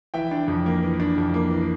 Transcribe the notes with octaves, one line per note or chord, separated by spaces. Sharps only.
E3 E5 G5
D4
F2
A#3
E3
D4
F2
A#3
E3